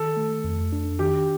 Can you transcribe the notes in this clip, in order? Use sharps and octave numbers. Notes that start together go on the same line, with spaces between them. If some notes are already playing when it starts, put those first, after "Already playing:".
Already playing: D#3 A4
A3
F2
D4
D#3 G4